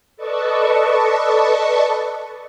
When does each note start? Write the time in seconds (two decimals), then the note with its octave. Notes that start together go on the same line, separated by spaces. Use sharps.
0.16 A4 B4 D5 D#5 A5 C#6